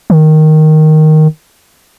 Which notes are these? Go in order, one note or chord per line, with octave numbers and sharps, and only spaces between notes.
D#3